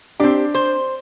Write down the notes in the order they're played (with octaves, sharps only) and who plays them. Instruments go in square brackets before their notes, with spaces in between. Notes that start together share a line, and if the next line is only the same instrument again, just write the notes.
[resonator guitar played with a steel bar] C4 G4 [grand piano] D4
[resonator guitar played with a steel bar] C5